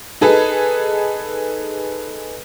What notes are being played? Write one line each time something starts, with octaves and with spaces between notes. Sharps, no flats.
D#4 G#4 A4 B4